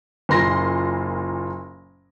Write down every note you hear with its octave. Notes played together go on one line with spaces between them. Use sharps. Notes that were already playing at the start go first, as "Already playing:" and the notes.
F#1 A#2 C6 A#6